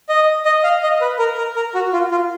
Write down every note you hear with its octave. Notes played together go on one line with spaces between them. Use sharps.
D#5
D#5
F5
D#5
B4
A#4
A#4
A#4
F#4
F4
F4